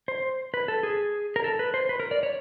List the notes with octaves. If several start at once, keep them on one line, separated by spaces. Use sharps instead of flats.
C5
B4
A4
G#4
A#4
A4
B4
C5
B4
A#4
D5
C#5